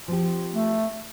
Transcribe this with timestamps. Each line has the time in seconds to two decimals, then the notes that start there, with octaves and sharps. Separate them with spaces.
0.08 F3 C4 G4
0.54 A3